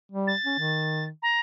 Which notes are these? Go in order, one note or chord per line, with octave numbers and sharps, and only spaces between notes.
G3
A6
C#4
D#3
A#5